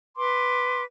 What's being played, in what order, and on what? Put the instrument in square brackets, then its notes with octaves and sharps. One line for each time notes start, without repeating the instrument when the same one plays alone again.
[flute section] B4 C6 D6